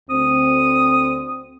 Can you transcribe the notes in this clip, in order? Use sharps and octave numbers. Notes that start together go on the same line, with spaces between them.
D2 C4 D#6